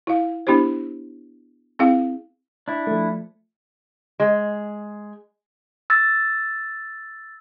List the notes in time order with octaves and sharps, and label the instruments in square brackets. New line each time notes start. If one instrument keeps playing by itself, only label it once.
[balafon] E4 F5
B3 D4 E4 G4 C5
C4 E4 G#4 F5 G5
[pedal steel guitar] D4 E4
[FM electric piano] F3 A3
[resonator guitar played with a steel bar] G#3
[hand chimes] E6 A6